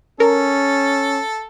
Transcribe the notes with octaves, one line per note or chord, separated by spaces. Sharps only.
C#4 A4 A#4